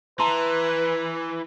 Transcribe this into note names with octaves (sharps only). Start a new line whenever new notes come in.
E3 B4 A5 A#5 C6